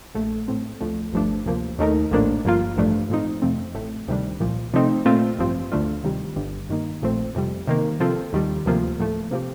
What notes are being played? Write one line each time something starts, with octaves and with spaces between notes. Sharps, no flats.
A#1 A#2 A3
A2 A3 C4
D2 D3 F3 A3
G1 G2 F3 A3 D4
D2 C3 F3 A#3
D#2 D#3 A3 D#4 A#4
A#1 A2 F3 A#3 D4
G1 G2 F3 A#3 F4
A1 G2 F3 A3 D4
A2 F3 C4 D#4
F2 C3 F3 A3 C4
A1 A2 A3
D2 C3 D#3 G3 D4
C2 A#2 F3
C3 F3 A3 C4 D#4
A#2 A3 C4 F4
A1 G2 F3 C4
D2 D3 A3 D4 F4
C3 D#3 G3
G1 G2 D3 G3
G2 D#3 A#3 D#4
A#1 A#2 F3 A3 C4
F2 C3 G3
C3 D#3 A#3
C3 F3 C4 F4 A4
D#2 D#3 G3
D2 C3 F3 A#3 F4
A2 F3 A3
C3 F3 C4 G4